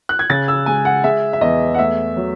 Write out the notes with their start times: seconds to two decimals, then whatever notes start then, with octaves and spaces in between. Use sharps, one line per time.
0.09 F#6
0.19 G#6
0.30 C#3 A6
0.48 E6
0.66 G#3 G#5
0.85 F#5
1.04 G#3 E5
1.33 E5
1.41 E2 D#5
1.74 F#5
1.79 A3 E5
2.17 F#3